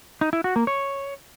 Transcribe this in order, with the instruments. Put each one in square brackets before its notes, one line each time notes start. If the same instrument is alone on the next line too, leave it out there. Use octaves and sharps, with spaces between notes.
[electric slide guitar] D#4
E4
F#4
A#3
C#5